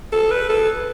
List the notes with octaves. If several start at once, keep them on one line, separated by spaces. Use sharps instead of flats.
A4
B4
A4